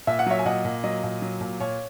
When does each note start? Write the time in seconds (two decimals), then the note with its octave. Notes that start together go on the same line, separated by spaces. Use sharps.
0.07 A#2 E5
0.19 F#5
0.26 F#3 C#5 E5
0.39 G#5
0.45 A#2 D#5 F#5
0.65 A#2
0.84 F#3 D#5
1.03 A#2
1.22 F#3
1.41 A#2
1.60 A#2 C#5